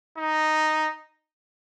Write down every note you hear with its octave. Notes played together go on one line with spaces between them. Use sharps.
D#4